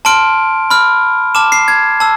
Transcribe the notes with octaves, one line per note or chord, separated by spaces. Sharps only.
A5 C6 F6 D7
B5 F6
A5 D6 F6 E7
C7
G#6
A5 E6